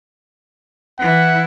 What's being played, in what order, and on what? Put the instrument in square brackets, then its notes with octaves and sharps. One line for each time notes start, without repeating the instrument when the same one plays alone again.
[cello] E3 E4 [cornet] F#5